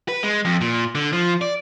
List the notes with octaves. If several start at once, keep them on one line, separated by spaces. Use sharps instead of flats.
B4
G#3
F2
A#2
D3
F3
D5